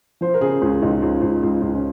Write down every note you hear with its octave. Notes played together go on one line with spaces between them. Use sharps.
F3 C5
A#4
C#3 G#4
C#2 C#4
C#2 D#4
C#2
C#2
C#2
C#2
C#4